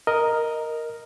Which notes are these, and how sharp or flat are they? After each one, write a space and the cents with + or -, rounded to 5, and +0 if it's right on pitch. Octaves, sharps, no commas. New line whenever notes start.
A#4 +0 D#5 +0